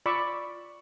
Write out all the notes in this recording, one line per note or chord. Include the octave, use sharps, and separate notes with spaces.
F4 D5 B5 C#6 D6 E6